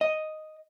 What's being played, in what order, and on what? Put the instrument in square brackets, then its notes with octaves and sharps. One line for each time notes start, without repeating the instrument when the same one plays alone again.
[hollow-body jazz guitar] D#5